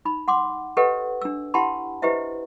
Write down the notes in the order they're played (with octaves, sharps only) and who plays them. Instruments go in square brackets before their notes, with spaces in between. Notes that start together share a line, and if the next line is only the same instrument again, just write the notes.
[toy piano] D#4 B5
F#5 C6 D6
G4 A4 B4 C#5 D#5 F#5
D4 E6
E4 G4 F#5 A5 B5 C6
E4 G4 B4 C5 D#5 E5